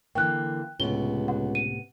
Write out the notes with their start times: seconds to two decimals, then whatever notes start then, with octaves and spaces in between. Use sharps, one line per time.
0.15 D3 E3 A#3 G5 F#6
0.80 C#2 A2 C3 B3 G7
1.28 F#5
1.55 D#7